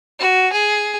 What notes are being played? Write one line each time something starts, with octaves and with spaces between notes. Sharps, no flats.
F#4
G#4